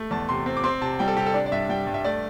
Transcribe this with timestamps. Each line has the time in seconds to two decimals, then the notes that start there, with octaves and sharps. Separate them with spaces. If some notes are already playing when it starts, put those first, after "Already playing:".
Already playing: A3
0.11 E2 A5
0.29 C3 C6
0.46 C4
0.57 D6
0.64 C4 C6
0.81 C3 A5
0.99 G3 G5
1.08 A4
1.17 C3 G4
1.26 A4
1.34 D4 D5
1.46 D5
1.52 G2 E5
1.69 G3 G5
1.87 G2
1.94 E5
2.05 A3 D5